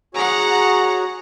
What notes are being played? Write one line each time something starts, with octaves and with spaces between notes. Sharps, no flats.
F#4 G#4 C#5 F#5 A#5